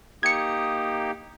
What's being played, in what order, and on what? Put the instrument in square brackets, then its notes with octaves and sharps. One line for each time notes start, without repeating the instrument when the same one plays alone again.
[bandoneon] A#3 D#4 G4 [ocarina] D#6 [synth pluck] G#6 C#7